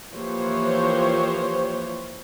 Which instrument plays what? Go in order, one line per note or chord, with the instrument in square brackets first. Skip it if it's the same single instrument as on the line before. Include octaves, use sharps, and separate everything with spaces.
[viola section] E3 F3 A#3 G4 C5 C#5